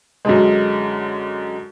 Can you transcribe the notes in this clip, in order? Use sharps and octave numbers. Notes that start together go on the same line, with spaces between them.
F#2 D3 G#3